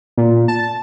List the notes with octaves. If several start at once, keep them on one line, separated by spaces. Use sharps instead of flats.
A#2
A5